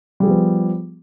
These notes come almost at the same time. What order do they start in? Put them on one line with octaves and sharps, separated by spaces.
G3 G#4 F3 B3